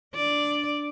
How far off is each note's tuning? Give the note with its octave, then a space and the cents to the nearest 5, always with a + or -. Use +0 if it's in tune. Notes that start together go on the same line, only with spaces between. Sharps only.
D4 +0 D5 +0